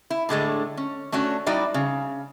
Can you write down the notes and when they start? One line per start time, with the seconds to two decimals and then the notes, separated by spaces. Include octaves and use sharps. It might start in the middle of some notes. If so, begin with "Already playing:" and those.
0.10 E4
0.29 A2 D3 G#3 A3
0.77 C#4
1.12 A3 C#4 D4 F#4
1.46 G3 D#4 E4 F#4 D5
1.74 C#3